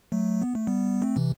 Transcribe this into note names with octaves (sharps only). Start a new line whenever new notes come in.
F#3 A3
B3
A3
G3 B3
A3 C4
C3 E3